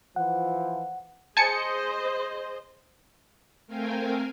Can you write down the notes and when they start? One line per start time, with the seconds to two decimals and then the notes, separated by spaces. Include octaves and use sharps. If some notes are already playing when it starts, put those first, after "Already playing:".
0.16 E3 F3 F#5
1.37 G#4 C5 D#5 G#5 A5 C#7
3.67 A3 C4 A#4 F5 G5 G#5